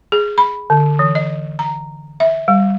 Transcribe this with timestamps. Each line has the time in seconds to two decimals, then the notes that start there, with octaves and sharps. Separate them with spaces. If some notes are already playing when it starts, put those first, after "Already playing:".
0.12 G#4
0.38 B5
0.70 D3
0.99 E3
1.15 D#5
1.59 A#5
2.20 E5
2.48 G3